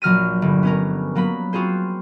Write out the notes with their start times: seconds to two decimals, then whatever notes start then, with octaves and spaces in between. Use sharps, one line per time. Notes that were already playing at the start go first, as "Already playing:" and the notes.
0.02 A#1 F#3 F6 A#6 D#7
0.42 G1
0.63 B3 C#4 A#4
1.15 F#3 A#3 B3 B5
1.53 C4 F4 F#4 G#4 C5